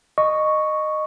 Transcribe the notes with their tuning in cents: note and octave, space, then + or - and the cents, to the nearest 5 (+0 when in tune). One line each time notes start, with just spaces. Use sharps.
D#5 -15 C#6 +0